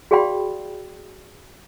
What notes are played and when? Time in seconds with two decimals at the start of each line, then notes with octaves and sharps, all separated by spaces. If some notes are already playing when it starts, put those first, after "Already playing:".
0.11 F#4 G#4 D5 F5 G5 B5